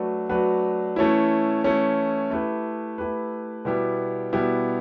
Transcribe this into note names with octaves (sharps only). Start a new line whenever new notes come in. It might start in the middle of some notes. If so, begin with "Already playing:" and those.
Already playing: F#3 A3 D4 F#4 B4
F#3 A3 D4 F#4 B4
E3 A3 C#4 E4
E3 A3 C#4 E4
A3 E4 G4 B4
A3 E4 G4 B4
B2 G3 B3 E4 G4
B2 G3 B3 E4 G4